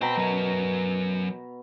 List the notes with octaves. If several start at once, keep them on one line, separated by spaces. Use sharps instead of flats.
B2 C5 G5 A#5 B5
F#3 A#4